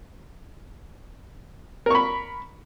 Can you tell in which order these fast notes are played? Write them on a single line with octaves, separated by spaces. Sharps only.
A#4 C#6 B5